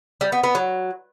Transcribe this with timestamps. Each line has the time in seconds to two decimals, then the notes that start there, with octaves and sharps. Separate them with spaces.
0.21 G3
0.32 B3
0.44 B3
0.55 F#3